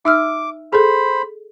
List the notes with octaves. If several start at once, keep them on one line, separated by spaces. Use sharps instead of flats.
D#4 E5 D6 E6 F6
G#4 A4 C5 B5